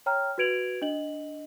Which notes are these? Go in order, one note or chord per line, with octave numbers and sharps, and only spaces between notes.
C#5 G5 A#5 F6
F#4 B4 G#6 D7 F7 F#7
D4 D#5 F#7